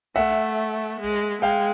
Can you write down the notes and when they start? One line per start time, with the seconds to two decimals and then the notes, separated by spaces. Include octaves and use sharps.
0.15 A3 E5 F#5
1.01 G#3
1.42 G#3 F5 G5